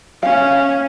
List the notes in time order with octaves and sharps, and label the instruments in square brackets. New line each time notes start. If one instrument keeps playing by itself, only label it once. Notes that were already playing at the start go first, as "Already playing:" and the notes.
[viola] C#4 [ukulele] F5